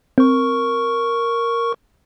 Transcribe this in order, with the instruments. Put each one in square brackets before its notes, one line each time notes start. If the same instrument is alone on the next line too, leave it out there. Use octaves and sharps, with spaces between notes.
[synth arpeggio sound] C4 [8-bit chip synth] A#4 C#6